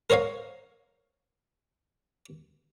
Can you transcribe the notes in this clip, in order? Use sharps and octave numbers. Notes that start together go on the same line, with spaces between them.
A#4 C5 C#5 D#5 F5